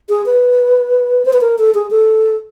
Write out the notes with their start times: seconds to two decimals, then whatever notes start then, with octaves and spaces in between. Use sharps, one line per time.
0.09 G#4
0.26 B4
1.25 C5
1.33 B4
1.41 A#4
1.58 A4
1.74 G#4
1.91 A4